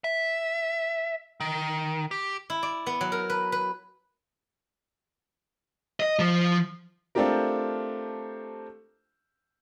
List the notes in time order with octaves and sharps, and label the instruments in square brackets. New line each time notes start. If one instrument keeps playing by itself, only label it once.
[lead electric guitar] E5
D#3
G4
[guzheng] E4
D5
B3
F#3
A#4
B4
B4
[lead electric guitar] D#5
F3
[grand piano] A3 C4 D4 F4 G4 A#4